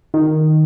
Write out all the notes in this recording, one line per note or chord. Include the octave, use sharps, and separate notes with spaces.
D#3